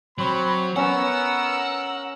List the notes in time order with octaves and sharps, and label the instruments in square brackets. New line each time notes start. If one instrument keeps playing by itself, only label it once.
[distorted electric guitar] F#3 [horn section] C4 C#5 B5
[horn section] B3 [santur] C#4 [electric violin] A#4 E6 [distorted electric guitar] F#5